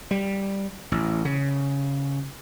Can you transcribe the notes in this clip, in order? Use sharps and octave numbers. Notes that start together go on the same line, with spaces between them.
G3
A1
C#3